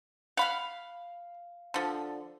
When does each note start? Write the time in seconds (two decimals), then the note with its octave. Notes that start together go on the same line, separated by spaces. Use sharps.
0.37 F5 F#5 B5 F6
1.74 D3 F3